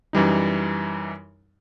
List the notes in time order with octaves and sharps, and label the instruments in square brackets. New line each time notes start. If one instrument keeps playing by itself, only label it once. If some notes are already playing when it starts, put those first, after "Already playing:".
[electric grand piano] F#2 E3 G3 D#4